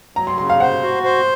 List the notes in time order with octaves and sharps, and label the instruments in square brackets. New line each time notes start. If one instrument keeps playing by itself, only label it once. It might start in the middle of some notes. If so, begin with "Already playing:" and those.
[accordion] F#3 [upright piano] A#5
[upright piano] C6
[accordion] C#3 [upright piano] C6
[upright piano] F5
[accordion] C5 [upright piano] F#5
[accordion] F#4
C5